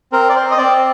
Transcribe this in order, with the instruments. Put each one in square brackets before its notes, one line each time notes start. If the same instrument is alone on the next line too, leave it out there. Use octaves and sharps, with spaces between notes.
[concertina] C4 A#4
D5
C5
D#5
C4 D5